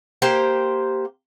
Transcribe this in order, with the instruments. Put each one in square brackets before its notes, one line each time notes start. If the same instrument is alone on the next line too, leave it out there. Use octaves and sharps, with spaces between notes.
[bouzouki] A#3 G4 C5 G5